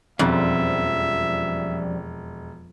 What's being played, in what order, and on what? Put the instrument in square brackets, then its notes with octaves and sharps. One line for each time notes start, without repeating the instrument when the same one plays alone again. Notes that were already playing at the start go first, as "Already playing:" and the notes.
[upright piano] E1 [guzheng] F2 [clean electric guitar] F3 G3 C#4 [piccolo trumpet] E5